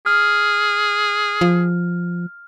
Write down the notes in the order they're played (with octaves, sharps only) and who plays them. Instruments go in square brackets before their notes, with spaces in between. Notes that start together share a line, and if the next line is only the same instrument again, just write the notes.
[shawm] G#4 [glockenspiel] F6
[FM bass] F3